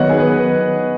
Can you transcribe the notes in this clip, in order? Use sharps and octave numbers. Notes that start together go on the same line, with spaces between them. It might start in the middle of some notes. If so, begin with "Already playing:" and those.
Already playing: D#3 F#3 B3 C#5 D#5 F#5
G#4
B4